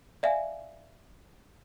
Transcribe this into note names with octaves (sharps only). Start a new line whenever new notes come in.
D5 E5 F5 G#5